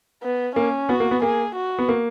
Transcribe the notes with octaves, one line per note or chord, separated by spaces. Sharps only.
B3
A#3 C#4
B3 F#4
A#3
B3
A#3 G#4
F#4
B3
A#3